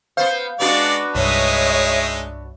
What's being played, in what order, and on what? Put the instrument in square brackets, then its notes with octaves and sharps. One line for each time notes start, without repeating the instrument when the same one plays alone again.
[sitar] B3 C5 [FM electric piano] F5
[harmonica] G#3 D5 [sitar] B3 D4 F#4
[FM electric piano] C2 G2 [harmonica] G#3 D#4 [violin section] C#5 E5 D#6